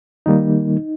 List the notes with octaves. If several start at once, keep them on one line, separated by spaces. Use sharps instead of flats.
D#3 G3 A#3 D#4